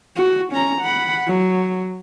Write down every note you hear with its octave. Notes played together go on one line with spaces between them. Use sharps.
F#4
C#4 A#5
F#5 B5
F#3